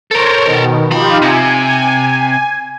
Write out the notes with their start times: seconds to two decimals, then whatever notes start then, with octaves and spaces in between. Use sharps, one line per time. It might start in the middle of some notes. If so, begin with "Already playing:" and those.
0.11 A4 A#4 C5 C#5
0.45 B2 D#3
0.91 F3 D#4 F4 G4 B5
1.22 C3 G#5